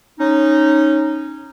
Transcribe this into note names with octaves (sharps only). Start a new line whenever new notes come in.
C#4 D#4